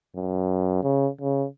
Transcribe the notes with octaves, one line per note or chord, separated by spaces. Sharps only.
F#2
C#3
C#3